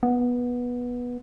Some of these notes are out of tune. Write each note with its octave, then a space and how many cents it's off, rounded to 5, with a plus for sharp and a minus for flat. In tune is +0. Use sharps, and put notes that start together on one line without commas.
B3 -15